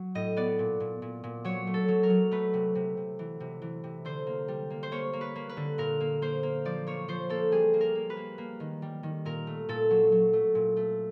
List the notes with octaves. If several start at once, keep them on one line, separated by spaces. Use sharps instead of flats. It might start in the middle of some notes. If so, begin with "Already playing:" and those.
Already playing: F#3
A2 D#5
B3 D5
A#2
A#2
A#2
A#2
F#3 C#5
A3
A4
F#3
A#4
F#3
A3 B4
C3
C3
C3
E3
C3
E3
C3
D3 C5
A#3
G3
A#3
C5
A#3 C#5
A#3
B4
A#3
B4
D3
A#2 A#4
A#3
A#3 C5
A#3
F3 D5
A#3 C#5
F3 C5
A#3 A4
G3 G#4
A#3
A#4
A#3
B4
A#3
A#3
D#3
G3
D#3
A#2 A#4
A3
A#2 A4
F#3
F#3
A3
A#2
A3